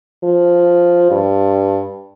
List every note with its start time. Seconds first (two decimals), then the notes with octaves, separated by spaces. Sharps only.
0.24 F3
1.10 G2